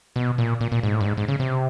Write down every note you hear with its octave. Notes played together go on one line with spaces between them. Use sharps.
B2
A#2
A#2
A#2
G#2
A2
G2
G#2
G#2
C#3
C3